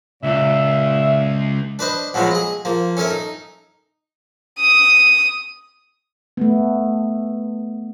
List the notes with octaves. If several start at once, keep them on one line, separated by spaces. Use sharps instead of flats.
C#2 A#2 E5
D4 B4 C5 D#5
B2 F3 F#3 G#3 B3
G#4 D#5
F3 A#3
C#4 A4 A#4 C#5 E5
D#4
D#6
A3 B3